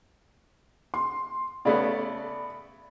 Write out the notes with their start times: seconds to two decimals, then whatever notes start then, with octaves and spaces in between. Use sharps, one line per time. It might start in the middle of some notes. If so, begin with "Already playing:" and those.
0.94 C6
1.65 C#3 A3 B3 D5 B5